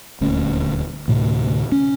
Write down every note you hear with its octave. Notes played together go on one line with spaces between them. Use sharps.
D#1 D2 C#4
D2 A2 C3
C#4